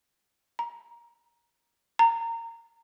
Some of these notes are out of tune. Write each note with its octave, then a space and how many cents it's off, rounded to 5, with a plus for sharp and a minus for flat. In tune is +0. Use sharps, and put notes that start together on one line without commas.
A#5 +15
A#5 -20